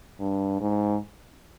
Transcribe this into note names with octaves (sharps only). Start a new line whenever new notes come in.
G2
G#2